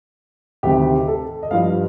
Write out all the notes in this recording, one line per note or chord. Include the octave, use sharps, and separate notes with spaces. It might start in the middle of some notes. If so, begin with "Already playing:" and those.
D2 C3 D#3 G4
A4
D#5
G2 F3 F5